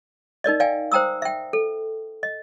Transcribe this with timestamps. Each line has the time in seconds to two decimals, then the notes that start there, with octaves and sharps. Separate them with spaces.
0.44 D#4 A#4 D5 D#5
0.60 D5 F5 G5 G#5
0.92 C5 G5 A#5 D#6 E6
1.22 E5 G5
1.53 A4
2.23 D#5